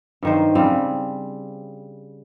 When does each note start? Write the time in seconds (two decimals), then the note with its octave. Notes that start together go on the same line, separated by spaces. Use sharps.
0.23 G2 D#3 C5
0.55 C#3 G3 C4